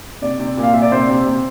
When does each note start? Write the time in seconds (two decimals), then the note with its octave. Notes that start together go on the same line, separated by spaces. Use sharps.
0.22 C3 D5
0.40 C3
0.57 A#2
0.63 F5
0.73 A#2 E5
0.82 D5
0.92 C3 C5
1.09 C3
1.26 C3